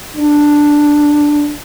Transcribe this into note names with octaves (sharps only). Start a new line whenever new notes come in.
D4